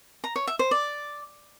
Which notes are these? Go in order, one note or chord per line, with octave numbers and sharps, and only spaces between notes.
A#5
C#5
E5
C5
D5